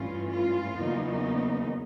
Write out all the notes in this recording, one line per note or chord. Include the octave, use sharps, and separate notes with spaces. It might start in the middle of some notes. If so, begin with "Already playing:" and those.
Already playing: G2 E3 A3 C#4 F4
F4
E2 C#3 F#3 A#3 D#4